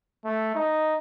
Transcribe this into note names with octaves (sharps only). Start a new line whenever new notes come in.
A3
D#4